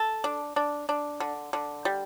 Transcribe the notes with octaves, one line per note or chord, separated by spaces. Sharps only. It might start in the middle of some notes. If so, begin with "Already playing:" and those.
Already playing: A4
D4
D4
D4
D3
D3
G3